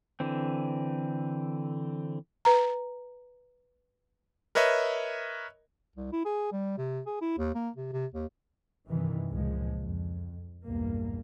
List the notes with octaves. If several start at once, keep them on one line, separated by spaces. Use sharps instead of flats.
D3 E3 C4
B4 A#5
A#4 B4 C#5 D#5 E5
C2
E4
G#4
G3
C3
G#4
E4
D#2
A#3
C3
C3
D#2
G2 C3 D#3 E3
C#2 A#2 F3 G#3
F2
B1 E2 G2 A#3